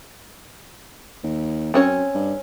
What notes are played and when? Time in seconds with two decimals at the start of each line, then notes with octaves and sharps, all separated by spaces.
1.23 D#2
1.74 F#2 C4 C#4 C#5
2.15 G2